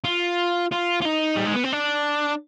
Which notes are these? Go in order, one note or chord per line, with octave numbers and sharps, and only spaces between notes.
F4
F4
F4
D#4
G3
G#3
B3
C4
D4